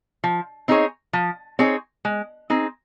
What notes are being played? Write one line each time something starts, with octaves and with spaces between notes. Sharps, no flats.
F3
C4 D#4 G#4 C#5
F3
C4 D#4 G#4 C#5
G#3
C4 D#4 G#4